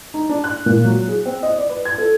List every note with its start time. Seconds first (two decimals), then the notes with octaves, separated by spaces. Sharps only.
0.14 D#4
0.29 D4
0.44 F#6
0.66 A#2
0.85 F#3
1.07 G#4
1.26 C4
1.43 D#5
1.57 D5
1.69 B4
1.85 G#6
1.98 A4